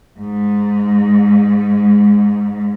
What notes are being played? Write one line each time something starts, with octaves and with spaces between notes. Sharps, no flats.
G#2 G#3